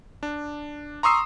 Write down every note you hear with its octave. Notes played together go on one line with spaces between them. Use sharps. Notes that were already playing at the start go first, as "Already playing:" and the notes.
D4
A#5 C6 C#6 D#6 E6 C7